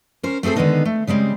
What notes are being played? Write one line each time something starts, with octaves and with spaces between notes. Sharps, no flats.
C#4 A#4 C5
A3 C4 G#4 A4 C5
D3 D#3 G#3 B3 C#4 D#4
A3
C#3 G3 G#3 C4